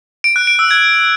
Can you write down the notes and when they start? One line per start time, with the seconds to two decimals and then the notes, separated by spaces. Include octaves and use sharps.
0.24 D7
0.36 F#6
0.47 D7
0.59 E6
0.71 G#6